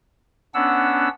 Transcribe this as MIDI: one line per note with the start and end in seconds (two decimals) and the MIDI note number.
0.54 1.09 59
0.54 1.09 61
0.54 1.09 62
0.54 1.09 78
0.54 1.09 88